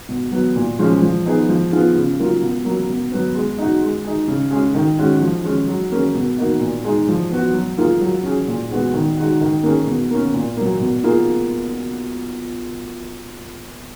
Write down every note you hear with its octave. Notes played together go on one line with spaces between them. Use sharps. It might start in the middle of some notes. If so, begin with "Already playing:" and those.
B2
F#3 B3
A#2
F3 G#3 C#4
F3
B3 D#4 G#4
F3
B3 F4 G#4
C#3
F#3 A#3 F4
B2
F#3 A#3
B2
F#3 B3
G#3
D#4 F#4
G#3
D#4 G#4
C#3
G#3 C#4 G#4
D#3
G#3 C#4 F#4
F3
G#3 C#4
F#3
A#3 C#4 G#4
B2
A#3 D#4 F#4
A#2
G#3 D#4 G#4
F3
B3 F#4
F#3
A#3 F4 G#4
F#3
C#4 G#4
A#2
G#3 B3 F#4
D#3
G#3 D#4 F#4
D#3
A#3 C#4 G#4
B2
A#3 C#4
A#2
F#3 A#3
B2
A#3 F4 G#4